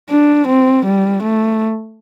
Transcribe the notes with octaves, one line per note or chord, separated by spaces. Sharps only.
D4
C4
G3
A3